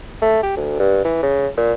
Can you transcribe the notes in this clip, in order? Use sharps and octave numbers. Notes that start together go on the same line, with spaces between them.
A3
G4
D2
G2
E3
C#3
A#2